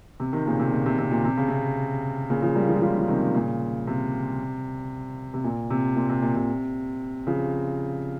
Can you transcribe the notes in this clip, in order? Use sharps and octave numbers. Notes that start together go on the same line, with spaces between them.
C3
C3 D#3
A#2 C#3
C3
A#2
C3
C3
A#2
C3
C#3
C3
A#2 C#3
C#3 F3
G3 A#3
F3 G#3
C#3 F3
F3
C3 D#3
A#2 C#3
C3
C3
A#2
C3
A#2
C3
A#2
C3
C#3 F3